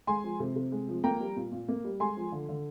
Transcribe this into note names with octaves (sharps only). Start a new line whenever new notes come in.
G#3 G#5 C6
F3
C3
C3
G#3
F3
A#3 G5 A#5
G3
A#2
A#2
A#3
G3
G#3 G#5 C6
F3
D3
D3